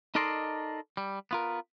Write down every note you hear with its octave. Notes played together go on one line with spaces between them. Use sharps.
D#4 A4 A#4 D5 D#5 C6
G3
B3 F4 A#4